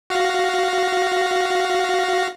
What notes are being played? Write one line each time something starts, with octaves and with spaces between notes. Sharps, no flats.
F#4 F5 A#6